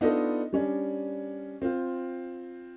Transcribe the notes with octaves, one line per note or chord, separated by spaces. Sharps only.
B3 D4 D#4 F4 A4 D#5
G3 C#4 D4
C4 F4